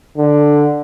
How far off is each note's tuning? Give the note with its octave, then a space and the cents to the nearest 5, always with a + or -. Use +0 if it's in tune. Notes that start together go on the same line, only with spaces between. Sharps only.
D3 +5